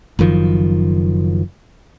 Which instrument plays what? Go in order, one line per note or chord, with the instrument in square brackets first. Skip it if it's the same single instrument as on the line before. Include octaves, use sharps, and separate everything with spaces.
[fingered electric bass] F#1 F#2 D#3 F3